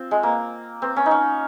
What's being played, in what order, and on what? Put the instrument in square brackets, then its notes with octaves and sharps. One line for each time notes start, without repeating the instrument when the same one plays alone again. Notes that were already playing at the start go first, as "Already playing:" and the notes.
Already playing: [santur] C4 F4
G#3
A#3
C4
C#4
D#4
C#4